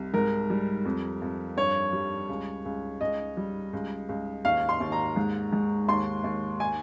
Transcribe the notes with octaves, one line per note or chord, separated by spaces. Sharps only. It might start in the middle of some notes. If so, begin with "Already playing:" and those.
Already playing: C2
G#2 A#4
G3
F2
F2
G2 C#5
G3
C#2
C#2
C#2 D#5
G3
C#2
C#2
D#2 F5
C6
D#2
A#5
G#2
G#2
D#2 C6
D#2
G#5